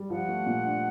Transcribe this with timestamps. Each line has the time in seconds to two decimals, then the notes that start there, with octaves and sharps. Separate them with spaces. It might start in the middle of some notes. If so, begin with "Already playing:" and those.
Already playing: G3
0.10 F3 F#5
0.28 A3
0.46 A#2
0.64 D4